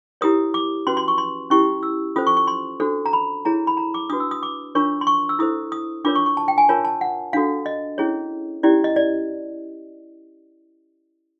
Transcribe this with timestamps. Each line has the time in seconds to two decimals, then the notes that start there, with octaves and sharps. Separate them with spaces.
0.21 E4 G4 A#4 C#5 D#6
0.54 D6
0.87 C#4 F#4 B4 C6
0.97 C6
1.08 C#6
1.18 C6
1.50 C#4 E4 G4 C#6
1.83 E6
2.16 C#4 F4 A4 C5 D#6
2.27 C#6
2.37 C#6
2.47 C6
2.80 D4 F#4 A4 C5
3.06 A#5
3.13 B5
3.45 E4 G#4 C#5 A#5
3.67 B5
3.77 A#5
3.94 D6
4.09 D4 D#6
4.12 F#4 B4
4.20 E6
4.31 D#6
4.43 D6
4.75 D4 F4 A#4 C#5 C#6
5.01 C6
5.07 C#6
5.29 E6
5.39 E4 A4 C5 D#6
5.72 D#6
6.05 D4 F4 A#4 C#5 D6
6.15 C#6
6.26 C#6
6.37 A5
6.48 G5
6.58 G#5
6.69 F4 A#4 C#5 A5
6.85 A5
7.01 F#5
7.33 D4 F#4 A4 F5
7.66 D#5
7.98 C#4 E4 G#4 C#5
8.63 C#4 E4 G4 D5
8.84 D#5
8.96 D5